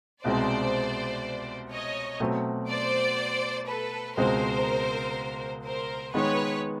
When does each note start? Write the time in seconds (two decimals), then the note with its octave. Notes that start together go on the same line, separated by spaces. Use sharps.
0.23 C2 B2 G#3 C4 C5 D5
1.72 C#5 D#5
2.20 B2 F#3 A3 C4
2.69 C5 D5
3.67 A4 B4
4.17 C#2 B2 G#3 C4 A#4 C5
5.65 A#4 C5
6.14 D#3 G#3 B3 B4 C#5